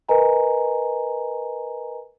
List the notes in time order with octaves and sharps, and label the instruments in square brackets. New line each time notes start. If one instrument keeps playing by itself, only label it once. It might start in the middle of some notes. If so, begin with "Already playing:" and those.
[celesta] A#4 B4 D#5 G#5 A#5